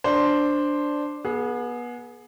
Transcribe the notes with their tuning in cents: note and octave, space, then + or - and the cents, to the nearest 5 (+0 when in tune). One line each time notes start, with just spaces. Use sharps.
D4 +0 C5 +0
B3 -30 G#4 +20